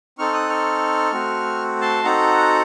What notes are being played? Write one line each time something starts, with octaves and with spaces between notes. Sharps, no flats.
C4 D#4 A4 C#6 F6
D#6 F#6
C#6 F6
A3 C4 F#4
A5 C6
C4 D#4 F#4 A4 F#5 A#5